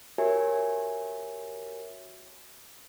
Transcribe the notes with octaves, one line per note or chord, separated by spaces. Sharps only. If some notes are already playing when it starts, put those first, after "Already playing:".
F#4 G4 A#4 C#5 E5 G#5